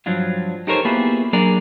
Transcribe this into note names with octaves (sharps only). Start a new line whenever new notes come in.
G2 F3 F#3 D4 F4
D#4 G4 A4 A#4 C5 C#5
A#3 B3 E4 F4 G4 G#4
F#3 A#3 D4 G#4 A#4 D5